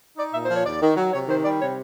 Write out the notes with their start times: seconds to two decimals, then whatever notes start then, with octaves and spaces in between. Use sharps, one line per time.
0.17 D#4 D5
0.33 A#2 E5
0.45 F3 C5
0.55 C#5
0.65 D#2 D5
0.81 D#3
0.96 F#3
1.13 C3 C#5
1.28 D#3 C5
1.44 G3 D5
1.61 C3 C#5